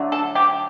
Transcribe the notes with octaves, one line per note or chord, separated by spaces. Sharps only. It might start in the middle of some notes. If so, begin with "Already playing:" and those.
Already playing: D3 F#3 A3
A4
G4